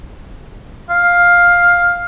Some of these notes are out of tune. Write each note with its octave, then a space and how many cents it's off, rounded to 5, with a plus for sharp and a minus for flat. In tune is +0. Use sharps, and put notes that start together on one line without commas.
F5 +10